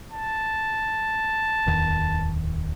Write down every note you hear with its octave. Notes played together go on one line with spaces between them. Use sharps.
A5
D1 E2 D#3